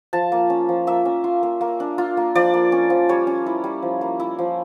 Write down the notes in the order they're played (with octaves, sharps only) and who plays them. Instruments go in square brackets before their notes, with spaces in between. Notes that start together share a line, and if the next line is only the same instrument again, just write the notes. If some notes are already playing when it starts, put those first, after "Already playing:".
[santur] F3 A5
A#3
C#4
F3
A#3 E5
C#4
F4
A#3
A#3
D4
F4
A#3
F3 D5
A#3
C#4
F3
G3 C#5
C#4
E4
G3
F3
A#3
E4
F3